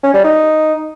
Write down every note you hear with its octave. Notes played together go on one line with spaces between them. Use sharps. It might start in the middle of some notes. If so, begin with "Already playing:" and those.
C#4
G3
D#4